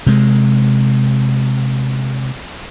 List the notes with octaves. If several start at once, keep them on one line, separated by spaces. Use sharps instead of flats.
C3 G#3